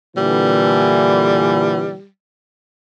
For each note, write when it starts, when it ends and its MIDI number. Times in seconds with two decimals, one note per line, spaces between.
0.17 1.95 46
0.17 1.95 50
0.17 1.95 52
0.17 2.08 55